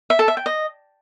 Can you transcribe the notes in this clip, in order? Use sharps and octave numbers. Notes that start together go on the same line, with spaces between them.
E5
A4
E5
G5
D#5